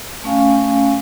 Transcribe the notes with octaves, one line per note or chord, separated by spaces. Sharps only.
A3 C#4 F5 G#5